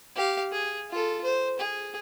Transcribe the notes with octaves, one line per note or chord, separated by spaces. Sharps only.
G4 F5
G#4
F4 A4
C5
G#4